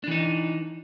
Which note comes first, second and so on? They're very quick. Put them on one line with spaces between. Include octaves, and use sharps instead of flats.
D4 E3 D#4